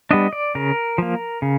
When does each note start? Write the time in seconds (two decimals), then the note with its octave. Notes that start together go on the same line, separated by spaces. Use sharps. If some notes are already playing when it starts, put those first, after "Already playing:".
0.11 G3 B3 D4 D#5
0.33 D5
0.55 C#3 A#4
0.98 F3 A#3
1.42 C#3